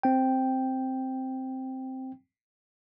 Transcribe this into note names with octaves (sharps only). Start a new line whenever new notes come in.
C4 G5